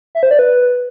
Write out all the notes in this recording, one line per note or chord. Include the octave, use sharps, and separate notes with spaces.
E5
C5
D5
B4